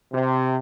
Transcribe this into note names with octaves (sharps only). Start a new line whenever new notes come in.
C3